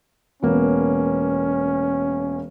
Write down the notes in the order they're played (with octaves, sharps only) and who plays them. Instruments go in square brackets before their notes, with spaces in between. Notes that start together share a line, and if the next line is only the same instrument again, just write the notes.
[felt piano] E1 A#3 B3 [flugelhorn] C#4